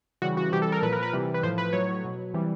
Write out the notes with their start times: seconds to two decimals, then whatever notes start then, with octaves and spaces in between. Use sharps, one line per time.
0.22 C#3 E3 G3 F#4
0.37 F#4
0.52 C3 E3 G3 G4
0.62 A4
0.72 A#4
0.83 A#2 F3 B4
0.93 A#4
1.03 B4
1.13 C3 E3 G3
1.34 B4
1.43 A2 F3 C5
1.58 B4
1.73 A2 F#3 C#5
2.03 B2 F#3
2.34 C3 E3 G3